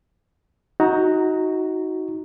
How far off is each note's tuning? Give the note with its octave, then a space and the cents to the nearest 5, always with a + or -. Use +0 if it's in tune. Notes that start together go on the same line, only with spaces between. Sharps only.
D#4 +25 F#4 +0 A#5 -5